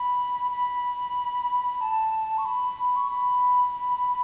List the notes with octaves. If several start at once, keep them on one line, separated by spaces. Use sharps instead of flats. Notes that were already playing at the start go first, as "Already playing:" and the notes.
Already playing: B5
B5
A5
C#6
B5
C#6
B5